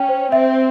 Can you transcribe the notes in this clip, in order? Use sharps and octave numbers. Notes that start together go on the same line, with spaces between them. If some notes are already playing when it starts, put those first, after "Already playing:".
Already playing: C#4 G5
C5
C4 E5